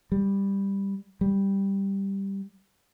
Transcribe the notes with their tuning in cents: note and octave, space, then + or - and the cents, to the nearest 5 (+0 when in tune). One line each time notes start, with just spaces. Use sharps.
G3 +10
G3 +0